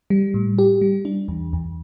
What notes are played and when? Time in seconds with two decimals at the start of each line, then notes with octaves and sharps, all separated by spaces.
0.10 G3
0.34 A2
0.59 G4
0.81 G3
1.05 D4
1.28 E2
1.53 E2